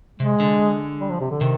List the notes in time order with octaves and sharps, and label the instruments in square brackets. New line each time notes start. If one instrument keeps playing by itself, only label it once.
[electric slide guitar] C3 [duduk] G#3
[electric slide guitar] D3
[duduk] G3
F3
C3
D3
[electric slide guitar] C3 [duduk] D#3